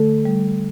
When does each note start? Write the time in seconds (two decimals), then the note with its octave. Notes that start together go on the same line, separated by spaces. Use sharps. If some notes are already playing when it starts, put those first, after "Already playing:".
Already playing: D3 A3 A4
0.25 G3